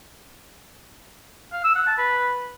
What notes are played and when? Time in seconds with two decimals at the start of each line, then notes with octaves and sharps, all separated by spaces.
1.53 F5
1.64 E6
1.75 F#5
1.87 A5
1.98 B4